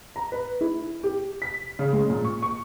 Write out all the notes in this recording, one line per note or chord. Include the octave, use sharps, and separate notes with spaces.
A#5
B4
E4
G4
B6
C#3
G#3
A#2
C#6
C#6